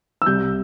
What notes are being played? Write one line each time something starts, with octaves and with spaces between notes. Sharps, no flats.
E6
C2 G6